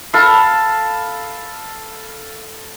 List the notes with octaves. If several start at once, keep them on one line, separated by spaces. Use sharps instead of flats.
A4 F5 B5